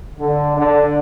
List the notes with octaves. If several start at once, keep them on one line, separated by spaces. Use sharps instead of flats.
D3
D3